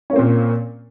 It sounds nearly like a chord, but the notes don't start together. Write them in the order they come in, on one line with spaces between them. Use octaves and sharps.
C#4 A#3 C4 A#2